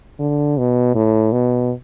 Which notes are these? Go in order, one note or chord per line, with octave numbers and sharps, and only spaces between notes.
D3
B2
A2
B2